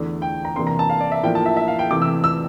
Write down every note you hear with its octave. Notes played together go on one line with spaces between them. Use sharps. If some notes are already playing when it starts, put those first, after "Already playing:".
Already playing: E2 D3 A3 D4
G5
A#5
C3 E3 A#3 D4 C6
A#5
A5
F5
D5
E5
A2 F3 A#3 D4 G5
A5
E5
E5
F5
G5
C3 E3 A3 E4 D6
E6
E6